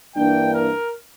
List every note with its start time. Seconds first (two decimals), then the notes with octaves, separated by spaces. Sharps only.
0.15 G2 E3 A#3 D4 G5
0.53 A#4